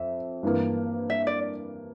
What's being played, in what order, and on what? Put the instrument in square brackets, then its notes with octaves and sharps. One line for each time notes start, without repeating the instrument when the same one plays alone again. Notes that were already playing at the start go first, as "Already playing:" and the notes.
Already playing: [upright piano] F2 [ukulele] E5
[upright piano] G2 E3 A#3
[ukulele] E5
D5